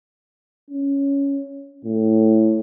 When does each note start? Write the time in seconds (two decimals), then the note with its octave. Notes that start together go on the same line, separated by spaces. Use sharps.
0.71 C#4
1.85 A2